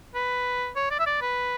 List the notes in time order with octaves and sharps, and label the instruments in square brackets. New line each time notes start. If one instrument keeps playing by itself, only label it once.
[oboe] B4
C#5
D5
E5
D5
B4